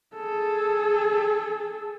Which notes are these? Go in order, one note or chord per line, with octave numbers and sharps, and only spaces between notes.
G#4 A4